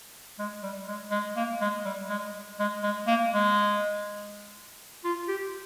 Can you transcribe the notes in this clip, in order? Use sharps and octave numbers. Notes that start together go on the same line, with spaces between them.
G#3
G3
G#3
G#3
A#3
G#3
G3
G#3
G#3
G#3
A#3
G#3
F4
G4